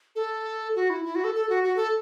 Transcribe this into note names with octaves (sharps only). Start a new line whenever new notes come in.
A4
F#4
E4
E4
F#4
A4
A4
F#4
F#4
A4